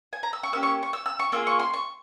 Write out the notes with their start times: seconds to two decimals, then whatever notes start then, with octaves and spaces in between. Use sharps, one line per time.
0.13 G#5
0.23 A#5
0.33 E6
0.43 C#6
0.52 A#3 C#4 G4 E6
0.63 C#6
0.83 C#6
0.93 E6
1.06 E6
1.19 C#6
1.32 A#3 F4 G#4 E6
1.47 C#6
1.59 C6
1.74 C#6